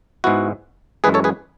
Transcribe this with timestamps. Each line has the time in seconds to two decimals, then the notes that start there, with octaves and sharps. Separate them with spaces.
0.24 G#2 G#3 B3 E4 F#4
1.04 F#2 E3 G#3 G#4 B4
1.14 A4 C#5
1.24 G#4 B4